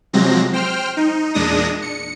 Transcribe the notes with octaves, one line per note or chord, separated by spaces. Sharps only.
C3 F3 F#3 G#3 C4 A#6
C5 G5 F6
D#4
E2 A#2 G#3 D4 D#6 A#6
C#7